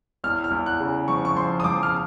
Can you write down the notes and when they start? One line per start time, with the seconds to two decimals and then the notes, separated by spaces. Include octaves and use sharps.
0.24 E2 F6
0.44 F6
0.51 E2
0.66 F#6
0.80 C#3
1.08 F3 C#6
1.25 C#6
1.35 F3 C6
1.60 D#6
1.64 F3 D6
1.83 F6